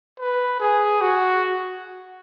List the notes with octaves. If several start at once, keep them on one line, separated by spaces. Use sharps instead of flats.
B4
G#4
F#4